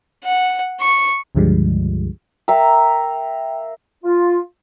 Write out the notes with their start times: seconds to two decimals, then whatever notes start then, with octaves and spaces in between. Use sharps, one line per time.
0.24 F#5
0.81 C#6
1.35 C#2 G2 D3 F3 G3 G#3
2.48 A#4 E5 F5 G5
4.04 F4